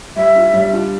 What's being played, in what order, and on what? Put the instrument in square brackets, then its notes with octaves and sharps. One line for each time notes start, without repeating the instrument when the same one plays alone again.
[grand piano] G3 [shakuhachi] E5
[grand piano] D4 F4
G3
D4 F4